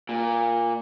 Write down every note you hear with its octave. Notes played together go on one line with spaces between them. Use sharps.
A#2